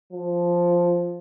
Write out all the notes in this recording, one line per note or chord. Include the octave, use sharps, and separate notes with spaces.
F3